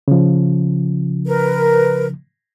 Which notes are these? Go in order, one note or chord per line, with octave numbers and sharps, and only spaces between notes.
C#3 F3
A#4 B4